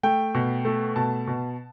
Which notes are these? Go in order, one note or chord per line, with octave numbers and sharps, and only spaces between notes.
A3 G5
B2
A3
B2 A5
B2